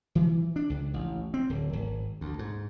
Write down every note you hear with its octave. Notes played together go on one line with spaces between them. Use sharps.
E3
D4
C#2
A1
C4
D1
G#1
D2
G#2